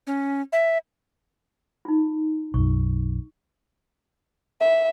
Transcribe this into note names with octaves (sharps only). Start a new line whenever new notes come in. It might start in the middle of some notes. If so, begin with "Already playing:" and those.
C#4
E5
D#4 F4
B1 F#2 C#6
E5